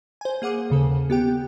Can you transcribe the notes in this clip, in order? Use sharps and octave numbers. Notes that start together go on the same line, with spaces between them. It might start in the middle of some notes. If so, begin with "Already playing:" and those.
C5 G#5
A#3 G#4 F#5 D6
D#2 C#3 A4
B3 G4 G5